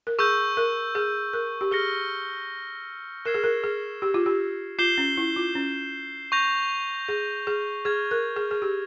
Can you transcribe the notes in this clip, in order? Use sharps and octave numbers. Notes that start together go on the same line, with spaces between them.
A#4
G#4 C#6 E6 G6
A#4
G#4
A#4
G4
G#4 F6 A#6 C#7 G7
A#4 E6 G#6 C7 E7 G7
G#4
A#4
G#4
G4
F4
G4
F4 G6 C7 E7 G7
C#4
E4
F4
C#4
C#6 G6 A#6 F7
G#4
G#4
G#4 F6 G#6 E7
A#4
G#4
G#4
G4